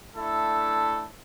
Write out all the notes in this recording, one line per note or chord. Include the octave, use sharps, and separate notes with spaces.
A3 D4 E4 A4